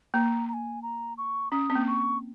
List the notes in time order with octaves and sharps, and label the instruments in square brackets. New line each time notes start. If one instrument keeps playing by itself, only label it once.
[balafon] A#3 [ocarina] A#5
[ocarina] A#5
G#5
A#5
C#6
[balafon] C#4 [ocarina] D#6
[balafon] C4
A#3
[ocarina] C#6